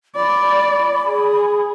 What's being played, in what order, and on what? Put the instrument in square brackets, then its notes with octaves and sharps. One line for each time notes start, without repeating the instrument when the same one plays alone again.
[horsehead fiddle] D5 [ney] B5
[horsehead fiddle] G#4